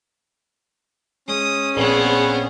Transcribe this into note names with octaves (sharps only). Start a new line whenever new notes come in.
G#3 C#4 D#6
A#1 B3 C4 G#4 B4 C#5